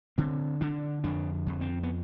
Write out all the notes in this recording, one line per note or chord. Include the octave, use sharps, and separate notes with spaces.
D3 C4
D3 D4
F2 D4
F2
C4
B3